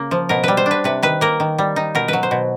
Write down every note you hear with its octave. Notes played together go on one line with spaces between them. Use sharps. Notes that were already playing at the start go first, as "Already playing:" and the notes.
Already playing: C#3 A#3
F3
B2 A#4
G3 B4
C5
D4
B4
C3 B4
D#3 B4
A#3 A#4
D#3
G3
D#4
B2 A#4
F#3 B4
C5
B2